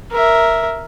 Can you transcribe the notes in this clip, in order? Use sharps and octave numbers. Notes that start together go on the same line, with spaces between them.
A#4 E5